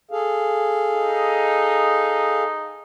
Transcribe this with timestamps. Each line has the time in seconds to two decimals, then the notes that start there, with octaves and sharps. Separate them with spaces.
0.11 G#4 A4 F5
0.93 D#4